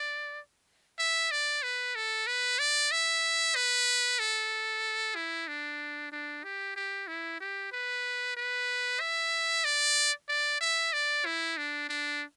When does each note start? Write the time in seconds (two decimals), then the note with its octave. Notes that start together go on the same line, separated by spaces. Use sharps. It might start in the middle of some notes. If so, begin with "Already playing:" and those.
Already playing: D5
0.99 E5
1.31 D5
1.63 B4
1.95 A4
2.27 B4
2.59 D5
2.91 E5
3.55 B4
4.19 A4
5.15 E4
5.47 D4
6.12 D4
6.44 G4
6.76 G4
7.07 E4
7.40 G4
7.72 B4
8.36 B4
9.00 E5
9.64 D5
10.29 D5
10.61 E5
10.93 D5
11.25 E4
11.57 D4
11.89 D4